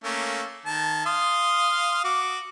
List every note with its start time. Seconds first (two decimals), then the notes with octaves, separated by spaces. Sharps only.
0.04 A3 A#3 C#4
0.66 D#3 A5
1.06 F5 C6 D#6
2.04 F#4 D6